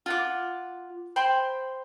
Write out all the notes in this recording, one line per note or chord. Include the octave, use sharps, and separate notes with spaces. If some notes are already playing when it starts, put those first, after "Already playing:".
F4 F#5 D6
C5 G5 B5 C6